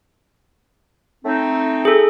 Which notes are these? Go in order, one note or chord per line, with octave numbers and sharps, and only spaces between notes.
A3 C4 D#4
G#4 A4